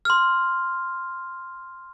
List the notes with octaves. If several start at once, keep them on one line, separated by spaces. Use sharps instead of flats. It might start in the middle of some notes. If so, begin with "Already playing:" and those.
C6 F6